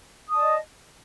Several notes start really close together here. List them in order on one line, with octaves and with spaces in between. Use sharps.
D#6 A5 D5 D#5